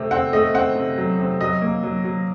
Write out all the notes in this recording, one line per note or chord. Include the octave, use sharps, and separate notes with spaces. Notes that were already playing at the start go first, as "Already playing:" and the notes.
Already playing: C3 A3 C4
C4 F#5
A3 D#5
C4 F#5
C3
F#3
C3
F#3 D#5
A#3
F#3
F#3